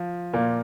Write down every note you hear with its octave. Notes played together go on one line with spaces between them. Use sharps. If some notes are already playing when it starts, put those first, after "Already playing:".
Already playing: F3
A#2 A#3